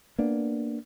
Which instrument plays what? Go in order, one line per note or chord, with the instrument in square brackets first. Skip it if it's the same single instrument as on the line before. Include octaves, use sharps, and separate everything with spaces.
[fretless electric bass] A#3 B3 D4